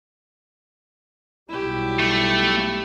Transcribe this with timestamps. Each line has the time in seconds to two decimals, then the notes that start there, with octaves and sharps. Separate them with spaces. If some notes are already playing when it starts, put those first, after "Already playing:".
1.49 B1 B2 G3 E4 G4
1.99 A3